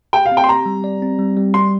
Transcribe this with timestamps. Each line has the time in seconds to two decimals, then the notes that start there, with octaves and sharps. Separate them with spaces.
0.13 G4 G5
0.26 F5
0.32 C4
0.37 G5
0.44 C6
0.48 G4 A#5
0.66 G3
0.84 D5
1.02 C4
1.19 G3
1.37 G3
1.54 G3 C6